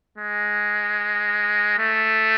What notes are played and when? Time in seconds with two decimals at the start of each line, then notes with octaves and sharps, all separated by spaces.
0.18 G#3
1.79 A3